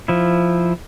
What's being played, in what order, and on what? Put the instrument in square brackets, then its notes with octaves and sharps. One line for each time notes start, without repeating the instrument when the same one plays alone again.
[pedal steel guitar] F3 E4